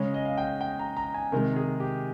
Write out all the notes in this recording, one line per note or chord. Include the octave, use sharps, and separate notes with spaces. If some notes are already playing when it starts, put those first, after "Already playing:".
Already playing: C#3 G#3 C#4 C#5
D#5
F5
G5
G5
A#5
A#5
G#5
C3 D#3 G#3 A#4
G#4
G4